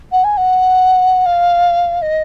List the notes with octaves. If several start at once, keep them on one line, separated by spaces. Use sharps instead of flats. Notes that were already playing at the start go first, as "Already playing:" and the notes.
F#5
G#5
F#5
F5
D#5